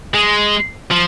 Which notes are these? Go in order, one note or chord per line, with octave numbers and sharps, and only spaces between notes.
G#3
F3